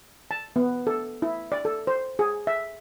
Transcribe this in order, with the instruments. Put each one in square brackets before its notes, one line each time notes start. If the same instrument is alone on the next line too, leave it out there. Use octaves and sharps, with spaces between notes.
[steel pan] A5
B3
A4
E4
D5
A4
C5
G#4
E5